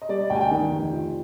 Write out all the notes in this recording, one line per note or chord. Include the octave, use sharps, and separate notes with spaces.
D#5
G3 D5
D#5
D2 G5
G#5
G5
D#3
F1
F3